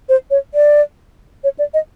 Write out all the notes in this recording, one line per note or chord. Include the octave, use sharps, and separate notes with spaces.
C5
C#5
D5
C#5
D5
D#5